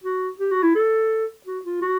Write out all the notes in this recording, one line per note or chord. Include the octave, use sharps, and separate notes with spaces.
F#4
G4
F#4
E4
A4
F#4
F4
F#4